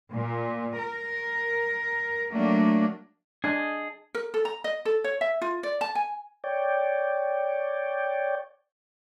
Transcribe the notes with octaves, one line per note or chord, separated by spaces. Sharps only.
A#2
A#4
F#3 A3 A#3 D4
D4 G#4 D#5 A5
A#4
A4
A#5
D#5
A4
C#5
E5
F4
D5
A5
G#5
C#5 D5 G5